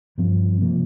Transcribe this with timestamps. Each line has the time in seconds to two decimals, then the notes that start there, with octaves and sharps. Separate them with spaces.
0.18 G2 F3 C4
0.60 C3 F3 A#3